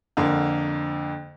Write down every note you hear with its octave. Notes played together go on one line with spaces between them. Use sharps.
F2 D3 A#3